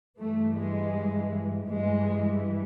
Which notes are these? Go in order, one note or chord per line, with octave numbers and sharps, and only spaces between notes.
G2 E3 A3
G#3
G2 E3 G#3